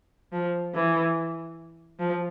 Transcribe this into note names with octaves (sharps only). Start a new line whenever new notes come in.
F3
E3
F3